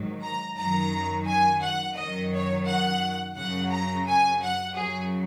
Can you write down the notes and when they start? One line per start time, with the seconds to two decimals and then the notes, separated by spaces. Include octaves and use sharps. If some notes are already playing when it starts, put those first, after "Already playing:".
Already playing: G#2 D#3 F#3
0.21 A#5
0.56 F#2 D#3 F#3 A#5
1.26 G#5
1.61 F#5
1.95 F#2 D#3 F#3 D#5
2.31 C#5
2.65 F#5
3.35 F#2 C#3 F#3 F#5
3.70 A#5
4.06 G#5
4.41 F#5
4.75 F#2 C#3 F#3 G#4